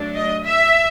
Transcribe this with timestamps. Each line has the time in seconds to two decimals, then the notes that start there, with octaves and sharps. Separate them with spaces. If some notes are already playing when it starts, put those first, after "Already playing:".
Already playing: F#3 A3 D4
0.15 D#5
0.45 E5